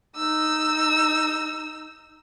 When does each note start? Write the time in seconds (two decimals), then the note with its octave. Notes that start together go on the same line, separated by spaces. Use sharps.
0.17 D#4 E6